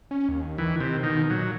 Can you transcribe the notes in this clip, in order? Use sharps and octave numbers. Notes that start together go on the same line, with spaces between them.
C#4
D#2
D#3 E3
C3
B2 D#3
A#2 F#3